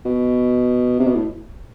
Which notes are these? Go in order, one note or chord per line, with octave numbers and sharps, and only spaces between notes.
B2
C3
B2
A2